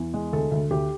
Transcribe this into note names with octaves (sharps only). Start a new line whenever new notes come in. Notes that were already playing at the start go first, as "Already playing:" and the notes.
Already playing: E2
G#3
D2 A4
D2
D2 G4